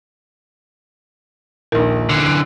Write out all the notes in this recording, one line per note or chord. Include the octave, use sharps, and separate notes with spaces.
D#1 A#1 D#4 A#4
D3 E3
C7 D7